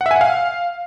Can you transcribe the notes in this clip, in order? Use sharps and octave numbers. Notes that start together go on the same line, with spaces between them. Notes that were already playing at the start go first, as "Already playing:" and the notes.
F#5
E5
G#5
F#5
F5